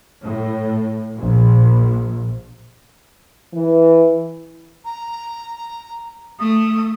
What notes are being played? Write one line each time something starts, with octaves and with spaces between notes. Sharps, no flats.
A2
A#1
E3
A#5
A3 D#6